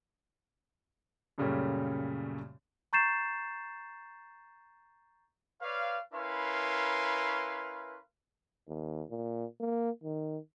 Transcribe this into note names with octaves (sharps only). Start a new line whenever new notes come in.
F#2 A#2 C#3 G3 A3 C#4
A#5 C#6 G6 A6 C7 E7
B4 C#5 D5 F5
C#4 E4 A#4 B4 F5 C6
D#2
A#2
A#3
D#3